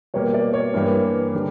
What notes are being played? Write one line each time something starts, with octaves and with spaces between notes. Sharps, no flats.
B2 G3 A#3 C#5
D5
C#5
G2 E3 G3 A#3
D3 G3